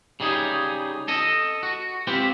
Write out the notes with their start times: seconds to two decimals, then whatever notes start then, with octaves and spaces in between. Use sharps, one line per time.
0.20 C#3 G3 D#4 G#4
1.08 A4 D#5
1.63 F#4
2.07 C4 F4 G4 B4